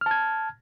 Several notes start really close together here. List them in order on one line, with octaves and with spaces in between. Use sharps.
F6 A5 G#6